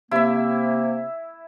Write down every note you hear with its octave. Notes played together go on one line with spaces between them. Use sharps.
C3 A#3 E4 E5